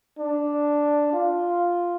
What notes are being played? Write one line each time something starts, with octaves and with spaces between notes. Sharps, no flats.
D4
F4